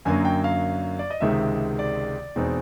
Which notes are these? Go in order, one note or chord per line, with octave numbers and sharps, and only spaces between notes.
F#2 D3 F#3 A#3 G#5
G5
F5
D5
D#5
C#2 C3 D#3 G#3 E5
D5
E2 B2 G#3 C4 D#4